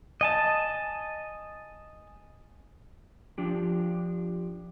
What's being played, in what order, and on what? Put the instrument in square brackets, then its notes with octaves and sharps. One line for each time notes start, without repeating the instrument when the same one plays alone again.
[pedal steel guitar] D#5 G#5 A5
[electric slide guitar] F3 D4 G4